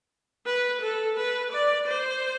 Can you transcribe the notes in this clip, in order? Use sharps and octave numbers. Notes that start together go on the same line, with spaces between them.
B4
A4
B4
D5
C5